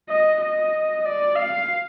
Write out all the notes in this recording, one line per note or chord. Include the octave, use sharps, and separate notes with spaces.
D#5
D#5
D5
F5